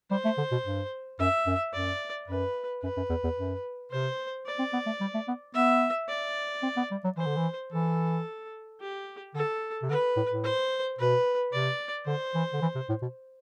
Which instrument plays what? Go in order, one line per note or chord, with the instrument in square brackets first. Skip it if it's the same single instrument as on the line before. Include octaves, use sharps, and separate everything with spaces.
[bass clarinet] G3 [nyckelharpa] C5
[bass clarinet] A3
D3
B2
G2
[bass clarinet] F#2 [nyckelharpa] E5
[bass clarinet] F#2
[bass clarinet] F#2 [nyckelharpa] D5
[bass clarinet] F#2 [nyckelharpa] B4
[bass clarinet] F#2 [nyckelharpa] B4
[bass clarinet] F#2
E2
E2
F#2
[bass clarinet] C3 [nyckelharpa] C5
[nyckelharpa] D5
[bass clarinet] C4
B3
A3
G3
A3
B3
[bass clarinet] B3 [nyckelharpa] E5
[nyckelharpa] D5
[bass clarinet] C4
B3
G3
F#3
[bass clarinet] E3 [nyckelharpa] C5
[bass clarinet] D3
E3
[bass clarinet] E3 [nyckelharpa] A4
[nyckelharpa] G4
[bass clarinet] D3 [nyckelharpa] A4
[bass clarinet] C3
[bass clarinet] D3 [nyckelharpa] B4
[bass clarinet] A2
A2
[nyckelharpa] C5
[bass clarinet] B2 [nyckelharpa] B4
[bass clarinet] C3 [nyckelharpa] D5
[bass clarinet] D3 [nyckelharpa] C5
[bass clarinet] E3
D3
E3
C3
A2
B2